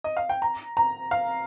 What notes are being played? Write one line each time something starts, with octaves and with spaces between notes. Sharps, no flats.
D#5
F5
G5
A#5
A#5
F5